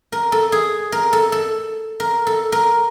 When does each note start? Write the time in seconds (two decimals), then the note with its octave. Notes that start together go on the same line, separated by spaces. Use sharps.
0.12 A#4
0.32 A4
0.52 G#4
0.92 A#4
1.13 A4
1.32 A4
2.00 A#4
2.27 A4
2.52 A#4